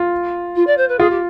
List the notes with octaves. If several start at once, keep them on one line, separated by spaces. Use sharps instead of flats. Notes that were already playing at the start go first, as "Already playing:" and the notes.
Already playing: F4
F4
D5
C5
B4
F4 G#4
G4